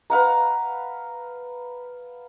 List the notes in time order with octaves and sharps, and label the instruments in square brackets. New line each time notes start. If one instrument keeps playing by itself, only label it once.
[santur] B4 F5 F#5 A#5